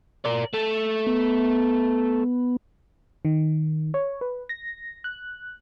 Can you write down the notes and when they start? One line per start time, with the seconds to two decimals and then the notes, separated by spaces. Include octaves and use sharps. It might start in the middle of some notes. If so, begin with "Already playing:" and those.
0.25 A#4 D5
0.54 A3
1.07 B3
3.25 D#3
3.94 C#5
4.21 B4
4.49 A#6
5.04 F#6